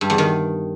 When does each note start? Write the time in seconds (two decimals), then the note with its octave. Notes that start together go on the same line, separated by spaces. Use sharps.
0.01 G2
0.10 E2
0.18 D#3